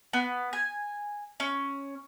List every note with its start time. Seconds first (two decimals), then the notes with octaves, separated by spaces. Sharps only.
0.13 B3
0.53 G#5
1.40 C#4